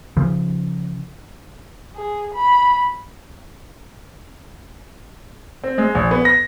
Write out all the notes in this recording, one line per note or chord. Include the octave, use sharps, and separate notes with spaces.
C#3 F3
G#4
B5
C4
G#3
A#1
B3
A#6